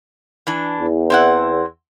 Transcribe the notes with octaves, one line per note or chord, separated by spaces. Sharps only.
E3 D4
E2
C4 E4 F#5